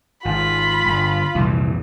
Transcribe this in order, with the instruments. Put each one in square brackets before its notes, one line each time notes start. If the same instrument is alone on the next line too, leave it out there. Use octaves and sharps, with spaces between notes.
[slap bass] G#1 [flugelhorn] F4 [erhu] B5
[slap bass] G1
[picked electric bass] C2 [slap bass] F2 A#2 E3